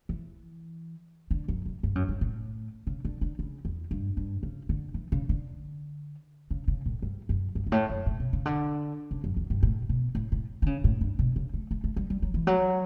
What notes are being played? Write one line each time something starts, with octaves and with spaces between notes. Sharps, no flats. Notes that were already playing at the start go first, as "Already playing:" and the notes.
E3
D3
F#2
F#2
G2
F#2
G2
A2
C#3
D3
D3
C#3
E2
G2
G2
C#3
D3
E3
C#3
D3
C#3
C#3
A2
G2
F#2
G2
G2
A2
F#2
A2
B2
C#3
D3
C#3
F#2
E2
G2
A2
B2
A2
A2
D3
C#3
A2
G2
B2
C#3
A3
A3
A3
G3
G3
F#3
E3
F#3